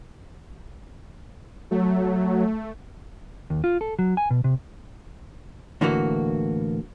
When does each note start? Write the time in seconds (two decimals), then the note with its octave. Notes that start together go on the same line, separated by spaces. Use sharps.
1.71 F#3 A3
3.50 D#2
3.64 F4
3.81 A4
3.99 F#3
4.17 G#5
4.30 B2
4.44 C3
5.81 A2 D3 E3 A#3 F#4